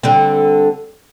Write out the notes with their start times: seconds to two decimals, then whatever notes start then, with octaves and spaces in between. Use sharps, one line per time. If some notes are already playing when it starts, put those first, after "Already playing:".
0.03 D3 G3 C4